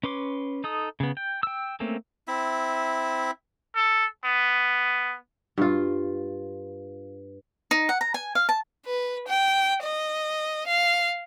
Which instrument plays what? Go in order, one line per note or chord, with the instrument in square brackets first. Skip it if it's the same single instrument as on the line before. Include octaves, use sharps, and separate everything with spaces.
[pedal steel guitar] C#4 B4 C6 D6
D#4 A4 D#6
C#3 B3
G5
G5 E6
A3 A#3 C4 C#4
[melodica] C4 E4 E5
[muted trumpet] A4
B3
[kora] G2 F4
[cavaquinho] D#4
F#5
A#5
G#5
F5
A5
[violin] B4
G5
D#5
F5